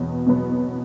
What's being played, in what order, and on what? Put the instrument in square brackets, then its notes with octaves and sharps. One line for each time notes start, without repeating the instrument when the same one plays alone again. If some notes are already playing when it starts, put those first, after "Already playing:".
Already playing: [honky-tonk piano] E2 B2 F#3 B3
B2 F#3 B3